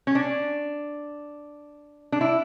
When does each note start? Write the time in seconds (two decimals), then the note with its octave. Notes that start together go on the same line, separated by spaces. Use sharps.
0.07 C#4
0.15 D4
2.12 D4
2.21 E4